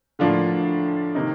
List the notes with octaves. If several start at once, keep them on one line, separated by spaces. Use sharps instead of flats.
A2 D3 F3 A#3 D4 F4
C3 D#3 A#3 D#4